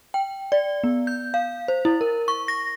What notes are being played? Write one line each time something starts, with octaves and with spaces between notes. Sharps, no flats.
G5
D5
B3
G6
F5
C5
E4
A#4
C#6
A#6